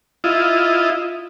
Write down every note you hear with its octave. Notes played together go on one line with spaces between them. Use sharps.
E4 F4 D#5